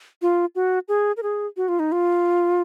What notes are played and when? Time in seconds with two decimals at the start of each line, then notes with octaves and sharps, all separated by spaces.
0.22 F4
0.55 F#4
0.88 G#4
1.17 A#4
1.23 G#4
1.57 F#4
1.68 F4
1.79 D#4
1.92 F4